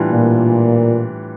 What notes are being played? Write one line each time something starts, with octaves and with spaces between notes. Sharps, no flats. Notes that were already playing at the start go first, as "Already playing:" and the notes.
Already playing: A2 E3 G3 D4 F4
A#2